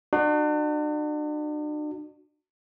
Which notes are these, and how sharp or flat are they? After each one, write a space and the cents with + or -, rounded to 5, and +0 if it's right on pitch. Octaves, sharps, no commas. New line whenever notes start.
D4 +40 F#4 -5